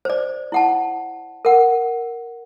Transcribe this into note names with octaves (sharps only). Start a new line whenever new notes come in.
C5 D5
E4 F#5 A5
A#4 F#5